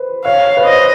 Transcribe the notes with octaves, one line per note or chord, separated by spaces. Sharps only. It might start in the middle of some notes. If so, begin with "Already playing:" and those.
Already playing: B4 C5
C#5 F5
B4
C5 D#5